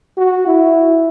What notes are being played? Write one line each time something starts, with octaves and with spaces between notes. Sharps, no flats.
F#4
E4